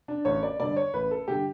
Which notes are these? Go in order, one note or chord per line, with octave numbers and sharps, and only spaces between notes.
D4
A1 C#5
D5
G2 D3 D5
C#5
A1 B4
A4
G2 D3 G4